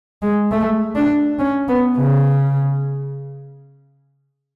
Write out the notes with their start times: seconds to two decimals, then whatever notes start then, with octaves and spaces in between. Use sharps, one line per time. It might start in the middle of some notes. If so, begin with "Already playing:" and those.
0.22 G#3
0.51 A3
0.96 D4
1.39 C#4
1.68 B3
1.97 C#3